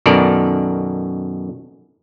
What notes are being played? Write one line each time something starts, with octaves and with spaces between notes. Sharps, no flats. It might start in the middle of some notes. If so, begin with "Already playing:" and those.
F#2 B2 D#3 A4 A#4 D5